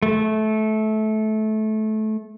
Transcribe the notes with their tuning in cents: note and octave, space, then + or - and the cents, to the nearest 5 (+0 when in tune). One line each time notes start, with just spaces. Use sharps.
A3 -20